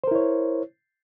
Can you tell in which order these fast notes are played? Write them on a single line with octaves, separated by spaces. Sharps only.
C5 A#4 E4 C#5